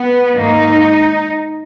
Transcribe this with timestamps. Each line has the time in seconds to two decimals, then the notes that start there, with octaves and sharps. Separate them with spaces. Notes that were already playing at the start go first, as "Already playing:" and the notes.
Already playing: B3
0.36 G#2 D#3 A#3 D#4